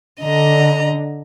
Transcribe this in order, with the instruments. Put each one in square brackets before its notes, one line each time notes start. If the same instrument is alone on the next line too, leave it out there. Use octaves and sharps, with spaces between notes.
[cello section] D3 [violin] D#5 A#5